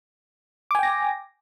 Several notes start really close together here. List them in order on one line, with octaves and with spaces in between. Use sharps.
D6 G#5 G5 A#6